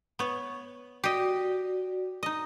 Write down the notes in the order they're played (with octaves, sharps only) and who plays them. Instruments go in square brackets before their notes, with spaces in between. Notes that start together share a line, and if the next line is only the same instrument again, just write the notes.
[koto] B3 C#5
[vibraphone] F#4 D5 [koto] G4 D#5
[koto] D#4 D#5